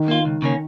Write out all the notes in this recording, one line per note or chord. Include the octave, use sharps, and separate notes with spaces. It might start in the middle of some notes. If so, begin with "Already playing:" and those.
Already playing: D#3
A#3 F4
C#2
C#3 A#3 C#4